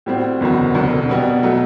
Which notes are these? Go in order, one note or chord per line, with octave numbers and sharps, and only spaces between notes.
A2 G3 C4 F#4
F#1 E2 D3 F#3
E1 D2 C3 F#3
B2 G3 B3
B2 F#3 A3